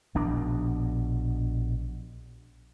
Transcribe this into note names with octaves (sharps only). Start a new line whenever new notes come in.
A#1 B2 D4